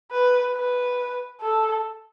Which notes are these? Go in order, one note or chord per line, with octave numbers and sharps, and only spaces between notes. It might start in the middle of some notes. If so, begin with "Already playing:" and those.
B4
B4
A4